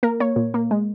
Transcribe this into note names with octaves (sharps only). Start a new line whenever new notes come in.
A#3 A#4
A#3 C#5
A#2
A#3
G#3